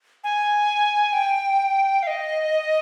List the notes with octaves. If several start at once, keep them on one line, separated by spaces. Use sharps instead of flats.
G#5
G5
F5
D#5